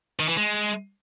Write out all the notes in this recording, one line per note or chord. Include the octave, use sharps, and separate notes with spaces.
D#3
E3
G#3